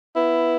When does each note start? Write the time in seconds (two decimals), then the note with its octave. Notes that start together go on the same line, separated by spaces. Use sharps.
0.16 B3 E4